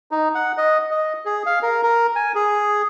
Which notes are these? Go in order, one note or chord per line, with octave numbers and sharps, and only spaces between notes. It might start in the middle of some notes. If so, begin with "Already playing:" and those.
D#4
F#5
D#5
D#5
G#4
F5
A#4
A#4
G#5
G#4